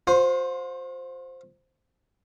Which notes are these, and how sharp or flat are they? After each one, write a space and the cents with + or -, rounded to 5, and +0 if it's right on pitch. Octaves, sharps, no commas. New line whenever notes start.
F4 +45 C5 +0